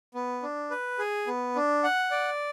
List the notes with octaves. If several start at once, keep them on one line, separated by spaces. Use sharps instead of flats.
B3
D4
B4
G#4
B3
D4
F#5
D5